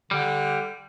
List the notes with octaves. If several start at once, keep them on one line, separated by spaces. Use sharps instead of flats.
D3 G3